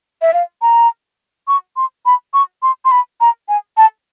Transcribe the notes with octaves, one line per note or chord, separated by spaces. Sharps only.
E5
F5
A#5
C#6
C6
B5
C#6
C6
C6
B5
A#5
G#5
A5